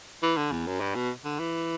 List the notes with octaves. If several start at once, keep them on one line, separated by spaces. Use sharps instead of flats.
E3
D3
E2
F#2
G2
B2
D3
E3